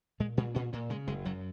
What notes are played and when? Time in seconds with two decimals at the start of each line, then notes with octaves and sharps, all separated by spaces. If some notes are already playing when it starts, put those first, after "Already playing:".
0.20 A#2 G#3
0.37 A#2 G#3
0.55 A#2 C#4
0.73 A#2 A#3
0.90 C#3 G#3
1.07 F#1 G#3
1.25 F#2 F#3